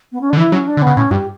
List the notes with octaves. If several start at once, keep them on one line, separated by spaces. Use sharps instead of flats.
B3
C#4
D3 D4
E3 E4
F#3 C#4
D4
D3
C#3 B3
A2 C#4
G2 G4